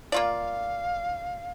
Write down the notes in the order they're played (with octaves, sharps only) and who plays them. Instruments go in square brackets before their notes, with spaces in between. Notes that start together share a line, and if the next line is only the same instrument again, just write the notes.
[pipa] A#3 F4 D5 [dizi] F5